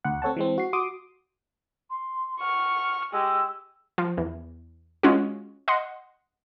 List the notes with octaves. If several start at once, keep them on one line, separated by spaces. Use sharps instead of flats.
D2 F#5
C4 A4 C#5 F#5 A5
E3 G#3 C4
F#4 C7
F#4 C6 D6 D#6
C6
F#5 C#6 F6
G#3 G4 E6
F3
E2
G#3 C#4 F4 F#4
D#5 F#5 C6